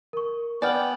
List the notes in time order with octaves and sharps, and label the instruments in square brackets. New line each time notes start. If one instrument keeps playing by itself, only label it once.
[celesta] A#4 C#6
[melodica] B3 [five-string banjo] D5 G5 [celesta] G#5 F6 F#7